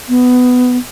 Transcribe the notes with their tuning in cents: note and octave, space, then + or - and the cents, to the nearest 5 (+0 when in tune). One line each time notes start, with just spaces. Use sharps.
B3 +15